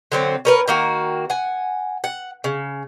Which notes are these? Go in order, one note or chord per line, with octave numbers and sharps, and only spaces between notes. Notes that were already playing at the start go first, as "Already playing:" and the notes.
D3 F#3 C4
C#4 A#4 B4
D#3 A#3 F#4
F#5 G#5
F#5
C#3